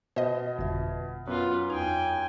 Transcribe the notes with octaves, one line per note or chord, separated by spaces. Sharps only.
B2 C5 D#5
G1 F2 E5
F#2 B3 F4
E2 D#4 G5 G#5